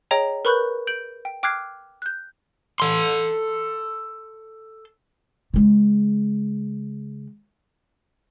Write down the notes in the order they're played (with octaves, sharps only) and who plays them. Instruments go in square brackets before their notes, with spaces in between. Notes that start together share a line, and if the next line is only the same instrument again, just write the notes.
[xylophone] G#4 C#5 D#5 G5 A#5
A#4 B4 B5 C#6 F#6 G6
G6 D7 F#7
G5
G5 D6 F6 F#6 G#6 C7
F#6 G6
[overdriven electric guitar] A4 C6
[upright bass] C#3 G#3